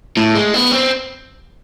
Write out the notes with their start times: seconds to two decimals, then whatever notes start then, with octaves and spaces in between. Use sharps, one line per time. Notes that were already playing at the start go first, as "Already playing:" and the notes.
0.17 A2
0.35 G#3
0.54 B3
0.72 C4